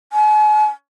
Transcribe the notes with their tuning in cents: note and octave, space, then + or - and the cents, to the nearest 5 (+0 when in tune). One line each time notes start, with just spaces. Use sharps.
G#5 +40